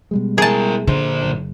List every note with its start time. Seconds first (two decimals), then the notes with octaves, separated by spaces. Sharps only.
0.11 B2 G3 G#3
0.38 E4 G#4 A#4 A5
0.87 A#2 D3 C5
1.23 F#1